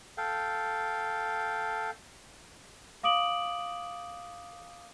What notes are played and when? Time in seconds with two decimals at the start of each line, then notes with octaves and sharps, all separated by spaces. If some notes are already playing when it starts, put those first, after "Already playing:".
0.18 A4 F5 G5
3.03 F5 D6 D#6 D7 F#7